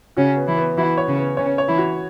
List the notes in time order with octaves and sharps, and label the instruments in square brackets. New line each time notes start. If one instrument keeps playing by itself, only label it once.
[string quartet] C#3 C#4 [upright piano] F#4
[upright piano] B3
[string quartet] E3 E4
[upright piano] B3
[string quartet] E3 E4 [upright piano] F#4
[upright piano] C#5
[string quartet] C#3 C#4
[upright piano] B3
[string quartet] C#3 C#4 [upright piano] C#5
[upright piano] C#5
[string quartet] E3 E4
[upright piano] F#4